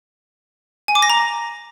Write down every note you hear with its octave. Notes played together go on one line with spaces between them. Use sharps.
G#5
D6
A#6
A#5